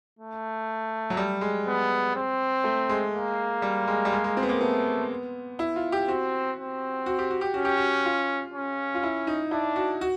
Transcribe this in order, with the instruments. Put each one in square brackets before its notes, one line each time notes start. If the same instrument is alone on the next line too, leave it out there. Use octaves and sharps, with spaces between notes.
[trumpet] A3
[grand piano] F#3
G3
G#3
[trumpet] B3
C4
[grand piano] A3
G#3
[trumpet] A#3
[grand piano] G3
G#3
G3
G#3
G#3
C4
B3
A#3
[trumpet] A3 [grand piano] B3
[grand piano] E4
F4
G4
[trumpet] C4 [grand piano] F#4
[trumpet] C4
[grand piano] F#4
G4
F#4
G4
[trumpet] C#4 [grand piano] F#4
[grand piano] G4
F#4
F4
[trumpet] C#4
[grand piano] F4
E4
D#4
[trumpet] D4 [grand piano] E4
[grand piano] F#4
F#4